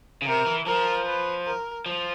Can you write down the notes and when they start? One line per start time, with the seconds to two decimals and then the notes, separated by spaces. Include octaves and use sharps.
0.22 C#3
0.27 C3 A#4
0.46 E3
0.66 F3 A#4
1.07 B4
1.46 A#4
1.86 F3